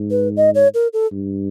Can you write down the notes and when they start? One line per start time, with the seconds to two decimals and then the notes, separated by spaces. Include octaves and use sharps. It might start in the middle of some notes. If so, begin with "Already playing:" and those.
Already playing: G#2
0.11 B4
0.37 D#5
0.55 C#5
0.74 A#4
0.93 A4
1.12 G2